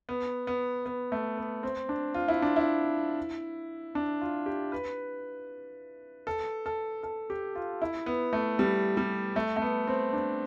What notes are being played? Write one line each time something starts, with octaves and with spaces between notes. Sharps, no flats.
B3
B3
B3
A3
B3
C4
D4
F4
E4
D4
E4
D4
F4
G4
B4
A4
A4
A4
G4
F4
E4
B3
A3
G3
G3
A3
A3
B3
C4
D4